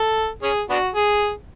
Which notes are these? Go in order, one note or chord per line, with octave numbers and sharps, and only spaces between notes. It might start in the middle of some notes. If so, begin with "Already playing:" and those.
Already playing: A4
C#4 G#4
B3 D4 F#4
G#4